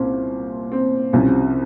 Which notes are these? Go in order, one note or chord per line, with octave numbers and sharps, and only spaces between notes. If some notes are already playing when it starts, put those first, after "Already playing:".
Already playing: C2 A#2 C4 C#4
C4
C2 C3 F3 C#4